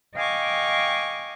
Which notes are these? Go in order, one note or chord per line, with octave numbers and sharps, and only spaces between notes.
D#5 F5 G5 G#5 C#6 D6